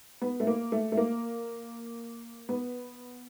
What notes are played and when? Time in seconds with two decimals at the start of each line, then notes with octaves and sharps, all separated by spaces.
0.22 B3
0.40 A3
0.47 A#3
0.72 A3
0.92 A3
0.97 A#3
2.49 B3